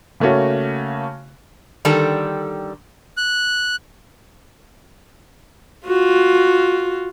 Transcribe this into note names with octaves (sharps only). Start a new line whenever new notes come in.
C#3 A3 A#3 C#4 F#4
D3 D#3 G3 A4
F#6
F4 F#4